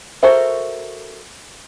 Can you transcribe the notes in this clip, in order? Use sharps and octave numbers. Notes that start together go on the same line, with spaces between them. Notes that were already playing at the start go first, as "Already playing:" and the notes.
F#4 A4 A#4 C5 E5